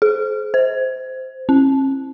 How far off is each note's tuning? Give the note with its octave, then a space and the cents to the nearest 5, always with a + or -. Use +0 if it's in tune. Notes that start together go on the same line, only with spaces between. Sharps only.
G#4 +45
C5 -10
C#4 -45